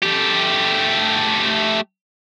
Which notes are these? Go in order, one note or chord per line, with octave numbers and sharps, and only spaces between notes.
A3 G4